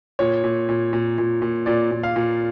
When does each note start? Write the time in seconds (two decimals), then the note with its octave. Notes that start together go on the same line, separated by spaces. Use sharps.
0.19 A#2 C#5
0.44 A#2
0.69 A#2
0.93 A#2
1.18 A#2
1.42 A#2
1.66 A#2 D5
1.91 A#2
2.03 F5
2.16 A#2